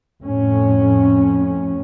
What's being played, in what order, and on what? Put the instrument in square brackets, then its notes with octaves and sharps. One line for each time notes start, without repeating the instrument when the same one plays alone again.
[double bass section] F2 A2 C#4